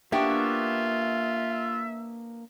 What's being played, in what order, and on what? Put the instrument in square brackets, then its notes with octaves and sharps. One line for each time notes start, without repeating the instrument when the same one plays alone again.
[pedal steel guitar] A#3 C#6 [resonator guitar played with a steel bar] B3 D4 G4 [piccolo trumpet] F4 [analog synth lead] E5